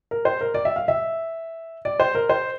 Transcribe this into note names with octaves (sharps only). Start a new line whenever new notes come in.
A#4
C5
A#4
D5
E5
F5
E5
D5
C5
A#4
C5